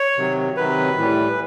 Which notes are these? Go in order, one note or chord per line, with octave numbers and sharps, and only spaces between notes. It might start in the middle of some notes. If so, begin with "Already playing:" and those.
Already playing: C#5
C3 D#3 F#3
C3 D#3 F#3 B4
A2 E3 G3